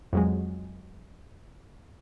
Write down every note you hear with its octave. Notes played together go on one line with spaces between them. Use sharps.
F2 F#3 G#3